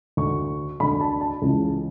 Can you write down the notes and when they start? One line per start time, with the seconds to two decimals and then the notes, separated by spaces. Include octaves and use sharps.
0.17 D2 D3 C#6
0.80 D2 D3 B5
1.01 A5
1.21 A5
1.42 C#2 C#3 E3